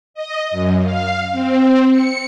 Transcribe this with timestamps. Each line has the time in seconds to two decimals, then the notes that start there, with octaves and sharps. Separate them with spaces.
0.14 D#5
0.51 F#2
0.83 F5
1.32 C4
1.91 C#7